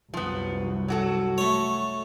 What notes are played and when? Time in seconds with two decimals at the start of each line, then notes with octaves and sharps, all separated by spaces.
0.14 C2 F#2 F3 B3
0.88 F#3 F#4 A4
1.38 A3 C#5